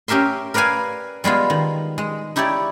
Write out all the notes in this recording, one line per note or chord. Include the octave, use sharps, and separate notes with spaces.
C#4 G4 A#4 E5 C6
A#4 B4 D5 F5 G#5
G3 G#3 B3 F4
D#3
G#3
D#4 E4 G4 C#5 D5